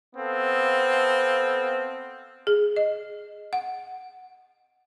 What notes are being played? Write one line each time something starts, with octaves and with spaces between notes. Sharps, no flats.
B3 C4 A4 F5
G#4
D#5
F#5